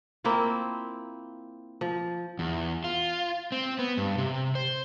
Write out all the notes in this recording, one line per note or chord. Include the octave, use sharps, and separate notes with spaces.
A#3 C4 E4 F4
F3
E2
F4
C4
B3
G2
C3
C5